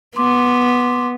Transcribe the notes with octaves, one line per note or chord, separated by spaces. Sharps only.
B3 C6 D6